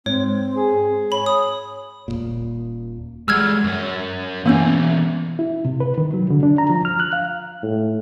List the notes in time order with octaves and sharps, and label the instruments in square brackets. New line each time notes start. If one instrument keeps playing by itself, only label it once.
[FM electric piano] G#2 [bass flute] C4 [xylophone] C#5
[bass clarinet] G#4
[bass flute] C#5 [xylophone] B5
[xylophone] D#6
[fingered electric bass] D#1 G#1 A#2
[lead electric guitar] F#3 G#3 [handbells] E6 F6 G#6
[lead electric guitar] F#2 F#3
[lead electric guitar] B1 E3 [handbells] A#3 B3 C#4
[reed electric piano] E4
C3
B4
D#3
F#3
D3
D4
A#5
F3
F6
F#6
F5
[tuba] A2